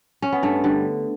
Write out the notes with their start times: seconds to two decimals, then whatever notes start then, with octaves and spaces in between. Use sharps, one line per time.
0.22 C#4
0.32 B3
0.42 G2 A3
0.64 D3 G3